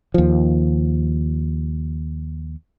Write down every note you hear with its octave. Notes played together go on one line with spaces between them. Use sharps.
D#2 F3